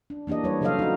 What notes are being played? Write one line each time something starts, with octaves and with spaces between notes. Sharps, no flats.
D4
E3 A#3 D4 G4 D#5
G3 B4 C#5
C#3 F#3 A4 C5 D#5 F5
D#4 F#4